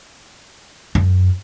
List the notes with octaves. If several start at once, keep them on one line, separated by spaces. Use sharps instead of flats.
F#2